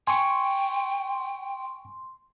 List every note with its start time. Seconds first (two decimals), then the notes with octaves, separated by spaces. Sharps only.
0.07 G5 G#5 C6 C#6